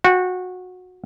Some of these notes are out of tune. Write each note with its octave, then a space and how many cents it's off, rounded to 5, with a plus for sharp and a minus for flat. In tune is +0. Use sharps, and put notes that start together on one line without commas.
F#4 -20 G5 +5